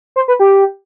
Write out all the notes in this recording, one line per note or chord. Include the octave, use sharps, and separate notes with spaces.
C5
B4
G4